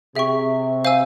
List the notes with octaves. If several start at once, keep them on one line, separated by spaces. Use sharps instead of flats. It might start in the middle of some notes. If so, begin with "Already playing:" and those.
C3 G#4 E5 G5 C#6
C5 F5 G#5 E6